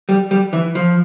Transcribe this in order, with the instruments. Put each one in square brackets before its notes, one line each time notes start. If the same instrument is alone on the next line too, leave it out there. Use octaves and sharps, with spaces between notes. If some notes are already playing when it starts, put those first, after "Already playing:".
[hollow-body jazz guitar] G3
G3
E3
F3